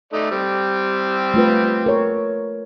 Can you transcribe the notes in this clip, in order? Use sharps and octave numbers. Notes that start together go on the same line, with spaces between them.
A3 D#4 D5
G3 C4 G4
A3 F4 B4
A#4 C#5